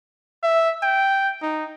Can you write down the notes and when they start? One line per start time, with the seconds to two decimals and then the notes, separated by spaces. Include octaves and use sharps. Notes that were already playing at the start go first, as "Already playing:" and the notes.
0.43 E5
0.83 G5
1.42 D#4